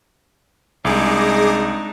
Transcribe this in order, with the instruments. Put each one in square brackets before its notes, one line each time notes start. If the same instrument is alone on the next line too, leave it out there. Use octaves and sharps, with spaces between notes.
[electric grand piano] C2 [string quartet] G#3 D4 D#4 [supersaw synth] G#4 D6